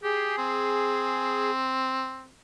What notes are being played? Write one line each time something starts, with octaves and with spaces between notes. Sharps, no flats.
G4 G#4
C4